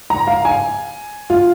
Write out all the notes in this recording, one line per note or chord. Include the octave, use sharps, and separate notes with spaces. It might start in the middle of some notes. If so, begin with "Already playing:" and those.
A#5
F5
G#5
F4